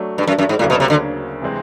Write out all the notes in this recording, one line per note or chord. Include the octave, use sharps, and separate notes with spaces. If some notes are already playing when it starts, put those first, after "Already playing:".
Already playing: F#3 A3 D4
G2
F#2
F#2
G#2
D2 A2 C#3 F#3 A#3 D4
B2
C3
D3
C3 E3 G#3 C4